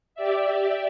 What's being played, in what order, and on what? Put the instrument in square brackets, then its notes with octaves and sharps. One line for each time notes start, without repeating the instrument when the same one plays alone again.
[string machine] G4 D5 E5